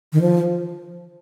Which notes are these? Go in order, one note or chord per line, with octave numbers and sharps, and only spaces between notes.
D#3
F3